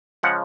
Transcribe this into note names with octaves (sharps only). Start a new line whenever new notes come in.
C#3 F3 G#3 F#5